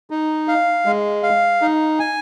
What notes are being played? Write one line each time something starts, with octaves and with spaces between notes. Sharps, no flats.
D#4
F5
G#3
F5
D#4
G#5